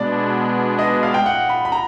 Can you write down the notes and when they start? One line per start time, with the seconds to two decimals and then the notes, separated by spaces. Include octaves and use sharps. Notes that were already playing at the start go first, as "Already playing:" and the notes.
Already playing: B2 G#3 B3 D4 D5
0.79 D#5
1.03 F5
1.14 G5
1.26 F#5
1.49 B5
1.65 B5
1.72 A#5